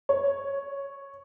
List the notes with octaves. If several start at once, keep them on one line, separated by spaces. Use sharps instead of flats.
C#5